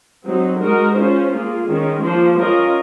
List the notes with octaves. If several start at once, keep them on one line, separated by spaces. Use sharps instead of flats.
F#3 C4 D#4
G#3 D#4 F#4 A#4
C#4 F4 C5
A#3 F4 G#4
D#3 G#3 C#4
F3 A#3 F4 C5
C#4 F4 A#4 D#5